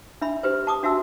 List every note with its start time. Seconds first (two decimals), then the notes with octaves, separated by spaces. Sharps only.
0.21 D4 E5 B5
0.43 G4 B4 C5
0.67 A5 D6 D#6
0.83 D4 F#4 E5 A5 E6